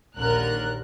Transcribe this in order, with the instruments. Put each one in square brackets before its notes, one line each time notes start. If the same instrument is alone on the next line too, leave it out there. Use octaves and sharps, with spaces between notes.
[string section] A#1 D#2 D3 A#4 F#6